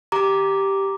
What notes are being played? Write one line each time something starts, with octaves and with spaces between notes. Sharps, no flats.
G4 A#5 D6